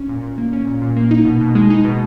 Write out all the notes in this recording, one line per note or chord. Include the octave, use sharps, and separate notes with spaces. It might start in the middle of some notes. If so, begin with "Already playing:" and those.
Already playing: C#4
A#2
A#2
A#3
C#4
A#2
A#2
A#3
D#4
B2
B2
G#3
D#4
B2